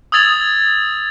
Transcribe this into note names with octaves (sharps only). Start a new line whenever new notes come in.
D#6 E6 G#6 A6 F7 F#7